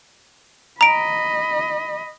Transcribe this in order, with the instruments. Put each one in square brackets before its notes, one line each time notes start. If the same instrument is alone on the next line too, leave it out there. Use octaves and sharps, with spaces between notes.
[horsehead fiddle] D#5 B5 [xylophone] A#5 D7